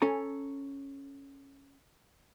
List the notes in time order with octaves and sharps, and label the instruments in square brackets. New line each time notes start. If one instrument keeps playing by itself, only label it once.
[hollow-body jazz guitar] C#4 A4 G#5 A#5